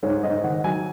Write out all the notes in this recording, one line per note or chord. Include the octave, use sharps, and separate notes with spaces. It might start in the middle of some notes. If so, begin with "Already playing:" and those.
G#2 C#5
G#2 D#5
D#3 F#5
F#3 G#5